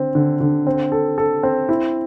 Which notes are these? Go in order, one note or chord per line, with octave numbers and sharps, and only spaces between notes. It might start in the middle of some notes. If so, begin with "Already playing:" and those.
Already playing: D3 C4
D3
D3
C4
A4
A4
C4
E4